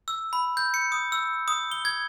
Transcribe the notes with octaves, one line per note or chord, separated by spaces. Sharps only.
E6
B5
G6
C#7
D#6
E6
D#6
G7
G#6